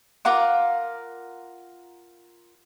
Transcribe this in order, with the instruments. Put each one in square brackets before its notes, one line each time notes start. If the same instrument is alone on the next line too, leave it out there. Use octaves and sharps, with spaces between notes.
[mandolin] F4 A#4 F#5 D6